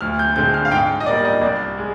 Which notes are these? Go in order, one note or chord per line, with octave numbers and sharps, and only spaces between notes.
D2 F6
G6
D3 G#3 C4 G6
F6
F5
G#2 G5
D#5
G3 A#3 D4 D5
D#5
C2 D5
G#3